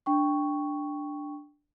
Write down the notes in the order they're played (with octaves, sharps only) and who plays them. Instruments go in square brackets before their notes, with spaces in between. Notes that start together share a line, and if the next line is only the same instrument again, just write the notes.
[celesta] D4 G5 C#6